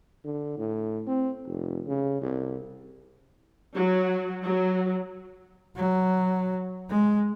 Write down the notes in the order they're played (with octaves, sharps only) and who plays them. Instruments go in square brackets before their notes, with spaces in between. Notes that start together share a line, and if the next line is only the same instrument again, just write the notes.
[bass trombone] D3
A2
C4
F1
C#3
C2
[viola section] F#3
F#3
[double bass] F#3
G#3